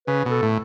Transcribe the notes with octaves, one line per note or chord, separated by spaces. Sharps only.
C#3 B4
B2
A4
A2